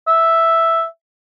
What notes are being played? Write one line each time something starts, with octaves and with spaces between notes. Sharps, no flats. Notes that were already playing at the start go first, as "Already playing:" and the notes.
E5